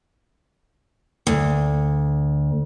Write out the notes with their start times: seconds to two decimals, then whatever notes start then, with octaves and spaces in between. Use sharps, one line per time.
1.27 D2